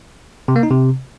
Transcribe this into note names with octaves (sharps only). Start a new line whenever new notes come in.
C3
A#3
D#4
C3